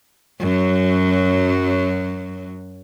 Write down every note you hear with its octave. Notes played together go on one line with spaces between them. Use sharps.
F#2 F#3